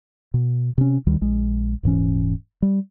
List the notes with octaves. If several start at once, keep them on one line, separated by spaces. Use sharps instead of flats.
B2
C3 C#4
D2 D#3 G3
A#1 G#3
D#1 G#2 E3 C#4
G3